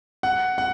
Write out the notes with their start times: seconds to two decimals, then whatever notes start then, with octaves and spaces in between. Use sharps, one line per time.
0.23 F#5
0.58 F#5